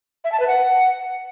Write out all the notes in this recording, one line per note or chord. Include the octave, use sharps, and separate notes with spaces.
E5
A5
B4
F#5